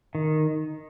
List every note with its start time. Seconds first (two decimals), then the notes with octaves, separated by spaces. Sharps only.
0.15 D#3